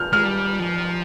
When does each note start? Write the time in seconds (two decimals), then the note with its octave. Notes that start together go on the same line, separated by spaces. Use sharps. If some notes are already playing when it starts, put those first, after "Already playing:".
Already playing: F6 G6
0.13 G#3 F6
0.25 G3
0.59 F3